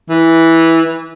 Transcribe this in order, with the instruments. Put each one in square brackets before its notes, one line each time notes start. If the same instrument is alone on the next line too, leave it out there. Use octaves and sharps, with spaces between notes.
[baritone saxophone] E3